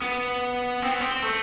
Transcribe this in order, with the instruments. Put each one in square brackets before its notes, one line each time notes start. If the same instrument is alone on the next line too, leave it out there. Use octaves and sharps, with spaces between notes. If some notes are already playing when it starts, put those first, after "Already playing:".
[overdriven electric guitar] B3
C4
B3
C4
A3